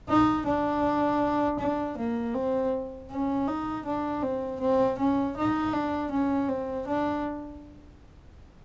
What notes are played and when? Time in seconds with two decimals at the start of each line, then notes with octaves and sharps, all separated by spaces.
0.09 D#4
0.46 D4
1.59 D4
1.97 A#3
2.34 C4
3.10 C#4
3.48 D#4
3.85 D4
4.23 C4
4.60 C4
4.99 C#4
5.37 D#4
5.73 D4
6.11 C#4
6.49 C4
6.87 D4